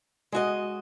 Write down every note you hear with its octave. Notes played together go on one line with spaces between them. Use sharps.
G#3 F#4 D#5